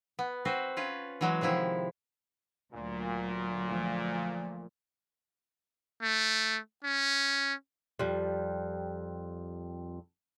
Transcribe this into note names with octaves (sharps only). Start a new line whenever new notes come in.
B3
C4 F#4 B4 C5
C#4 F4 B4
E3 F#3 G#3
C3 D#3 F3 E4
D2 A#2 F#3
F3 A3
A3
C#4
F2 G3